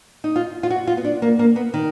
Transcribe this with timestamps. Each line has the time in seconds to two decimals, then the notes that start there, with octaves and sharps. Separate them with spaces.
0.24 D#4
0.36 F4
0.63 F4
0.70 F#4
0.87 F4
0.97 B3
1.04 D4
1.22 A#3
1.39 A#3
1.56 B3
1.74 D#3